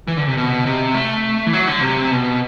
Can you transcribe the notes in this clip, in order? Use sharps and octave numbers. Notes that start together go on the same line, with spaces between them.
E3
D3
C3
B2
C3
A3
E3
F#3
D3
C3
B2